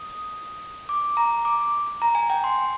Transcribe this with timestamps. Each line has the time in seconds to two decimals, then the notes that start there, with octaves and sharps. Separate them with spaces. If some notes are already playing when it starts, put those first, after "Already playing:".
Already playing: D#6
0.89 D6
1.17 A#5
1.45 D6
2.02 A#5
2.15 G#5
2.30 G5
2.44 C6